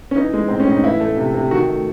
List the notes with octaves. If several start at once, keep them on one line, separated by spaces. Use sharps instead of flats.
C#4
E3 D#4
G#3
A2 C4
C#4
A2 D#4
E3 E4
A3
C3
C3
D#3 F#4
A3